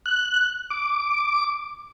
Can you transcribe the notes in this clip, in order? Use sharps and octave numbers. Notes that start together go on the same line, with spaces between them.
F#6
D6